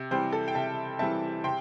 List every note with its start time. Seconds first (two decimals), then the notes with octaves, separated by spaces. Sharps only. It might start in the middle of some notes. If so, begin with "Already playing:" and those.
Already playing: C3
0.11 E3 G3 C4 C5
0.32 A4
0.48 G5
0.55 C3 E5 A5
0.99 E3 G3 C4 E5 A5
1.44 C3 G5 C6